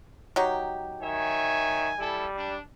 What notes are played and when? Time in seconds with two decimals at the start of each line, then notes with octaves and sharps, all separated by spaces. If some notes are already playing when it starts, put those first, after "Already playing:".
0.36 F#3 D#4 G4
1.02 D#3 C#5 E5 G#5
1.99 G3 E4 A4
2.37 D4